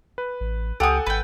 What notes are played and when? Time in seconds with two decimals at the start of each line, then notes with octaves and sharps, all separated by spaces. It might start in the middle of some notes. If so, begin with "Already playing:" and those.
0.18 B4
0.40 A1
0.80 C#2 G4 A4 F#5 G#5 D#6
1.06 G#1 B4 G5